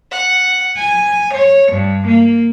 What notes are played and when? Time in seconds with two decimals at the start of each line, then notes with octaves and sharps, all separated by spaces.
0.12 F#5
0.76 G#5
1.33 C#5
1.71 G2
2.07 A#3